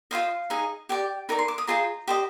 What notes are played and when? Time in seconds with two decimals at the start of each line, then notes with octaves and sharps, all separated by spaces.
0.11 F4 G#4 C5 D#5 F5
0.50 D#4 G#4 D#5
0.89 G4 D5 G5
1.29 D#4 A#4 D5 A#5
1.39 C6
1.48 D6
1.58 D#6
1.67 F4 G#4 C5 D#5 A#5
2.07 G4 C5 D#5